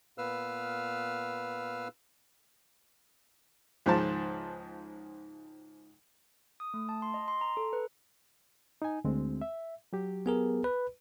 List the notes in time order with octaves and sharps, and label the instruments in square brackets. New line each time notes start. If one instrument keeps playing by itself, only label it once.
[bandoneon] A#2 B3 B4 F5 E6 F6
[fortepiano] C#2 G#2 D#3 F3 C5 A5
[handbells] D#6
A3
A5
C6
D#5
C6
A#5
A4
B4
[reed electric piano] D#4 G#5
D2 G#3 C4
E5
F#3 G4
[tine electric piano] B3 G#4 A#4
B4